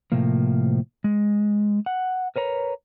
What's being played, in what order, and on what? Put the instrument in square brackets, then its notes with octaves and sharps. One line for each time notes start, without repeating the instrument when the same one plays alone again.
[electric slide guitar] A2 C3 F3 A#3
G#3
F#5
A#4 B4 C#5 A#5